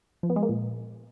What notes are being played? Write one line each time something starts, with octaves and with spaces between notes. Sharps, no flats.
F3
B3
G#3
A#3
A#2